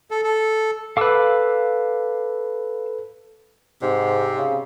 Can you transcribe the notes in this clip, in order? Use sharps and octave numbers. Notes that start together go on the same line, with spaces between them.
A4
A4
A4 B4 F5 D6 E6
G#2 C3
C#3